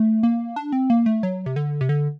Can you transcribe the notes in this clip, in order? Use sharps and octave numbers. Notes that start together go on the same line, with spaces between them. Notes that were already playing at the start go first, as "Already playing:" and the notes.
Already playing: A3
A#3
D4
C4
A#3
A3
F#3
C3
D3
C3
D3